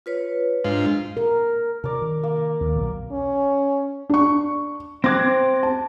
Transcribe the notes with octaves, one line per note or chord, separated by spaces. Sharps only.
F4 B4 C#5
G#2 D4 F4
A#4
C3 A#4 D5
D#3
A#3
D#2
B1 B2 D#3
C#4
D4 C#6
C4 D6 F#6 G#6 A#6
A5